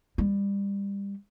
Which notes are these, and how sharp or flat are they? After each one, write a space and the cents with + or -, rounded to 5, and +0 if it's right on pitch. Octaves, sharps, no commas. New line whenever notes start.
G3 +25